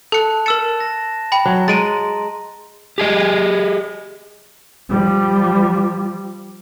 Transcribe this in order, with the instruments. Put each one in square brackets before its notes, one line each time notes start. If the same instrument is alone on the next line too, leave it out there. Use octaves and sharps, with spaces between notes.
[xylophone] A4 C#7 [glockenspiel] A5 F#6
[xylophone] A#4 E6 C#7 [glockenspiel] A6 E7
[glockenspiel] A#6
[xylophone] G5 B5
[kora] F#3
[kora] G#3 [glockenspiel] A#5 C6 [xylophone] A6 D7 D#7
[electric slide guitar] G4 G#4 D#5
[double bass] F3 G3